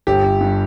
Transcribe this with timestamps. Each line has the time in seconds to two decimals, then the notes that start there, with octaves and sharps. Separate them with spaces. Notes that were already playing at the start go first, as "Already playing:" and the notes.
0.07 G1 G4
0.24 G1
0.41 G2